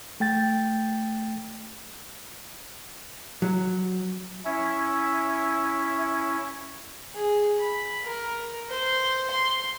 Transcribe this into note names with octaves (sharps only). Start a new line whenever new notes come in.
A3 G5 A6
F#3
C#4 E4 E5
G#4
B5
A#4
C5
C6